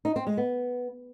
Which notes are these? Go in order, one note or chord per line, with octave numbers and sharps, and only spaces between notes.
D#4
C4
G#3
B3